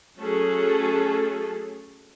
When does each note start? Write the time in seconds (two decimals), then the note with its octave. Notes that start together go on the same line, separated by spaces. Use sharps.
0.18 F#3 A3 C#4 G#4 A4